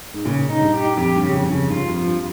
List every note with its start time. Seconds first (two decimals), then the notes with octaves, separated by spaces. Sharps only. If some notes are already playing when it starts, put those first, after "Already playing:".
0.14 G#2
0.25 A#2 C#3
0.49 D#4
0.61 G2
0.74 G4
0.97 F2 G4
1.16 G2
1.21 C#3
1.34 F2
1.44 G2 C#3
1.51 F2
1.65 G#2
1.70 G2 F4
1.88 F2
1.94 F3
2.07 G2